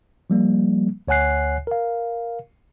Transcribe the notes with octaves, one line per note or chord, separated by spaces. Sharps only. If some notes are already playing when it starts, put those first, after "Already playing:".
F3 G3 A#3
D2 C#5 F#5 G#5 F#6 C7
A#4 F5